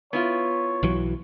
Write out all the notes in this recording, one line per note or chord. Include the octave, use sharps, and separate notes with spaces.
B3 E4 F4 C#5
B1 E3 F#3